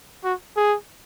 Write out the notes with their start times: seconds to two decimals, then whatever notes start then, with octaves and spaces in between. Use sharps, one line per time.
0.24 F#4
0.56 G#4